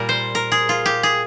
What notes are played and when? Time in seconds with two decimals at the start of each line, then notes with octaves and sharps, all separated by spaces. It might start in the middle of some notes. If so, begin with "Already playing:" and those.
Already playing: A#2 G3 A#4
0.09 C5
0.35 A#4
0.52 G#4
0.69 F4
0.86 G4
1.03 G#4